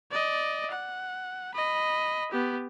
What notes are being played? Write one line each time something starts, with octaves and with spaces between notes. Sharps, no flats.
D5 D#5
F#5
D#5 B5
B3 G4